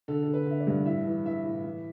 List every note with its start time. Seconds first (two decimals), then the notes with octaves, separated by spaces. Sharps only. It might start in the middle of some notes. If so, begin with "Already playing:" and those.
0.08 D3 A4
0.23 A4
0.28 D3
0.34 B4
0.46 D3 E5
0.60 D5
0.67 G2
0.86 A2 E5
1.06 E3
1.25 E3 E5
1.45 A2
1.64 E3